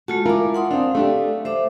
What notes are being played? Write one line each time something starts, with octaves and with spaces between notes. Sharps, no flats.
G#3 A3 F4 F#4 A5
E4 F4 A#4 G#5 D6
F#5 C6 D#6
C4 D4 F5
A3 D4 G4
A3 C5 E5 D6